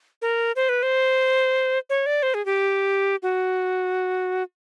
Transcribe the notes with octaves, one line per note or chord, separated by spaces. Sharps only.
A#4
C5
B4
C5
C#5
D5
C5
G#4
G4
F#4